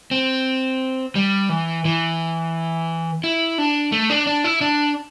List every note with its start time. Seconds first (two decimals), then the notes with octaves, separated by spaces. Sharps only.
0.11 C4
1.15 G3
1.49 E3
1.85 E3
3.24 E4
3.58 D4
3.92 A3
4.10 D4
4.27 D4
4.44 E4
4.61 D4